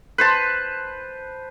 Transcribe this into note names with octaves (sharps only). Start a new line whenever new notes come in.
B4 C5 A5